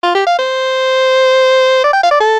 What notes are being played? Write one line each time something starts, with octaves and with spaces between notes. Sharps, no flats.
F4
G4
F5
C5
D5
G5
F5
D5
A4